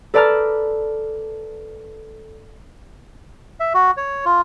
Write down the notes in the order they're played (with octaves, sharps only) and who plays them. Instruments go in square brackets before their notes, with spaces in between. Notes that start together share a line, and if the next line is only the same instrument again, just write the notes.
[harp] A4 B4 D5 A5 A#5 F6
[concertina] E5
F#4
C#5
F4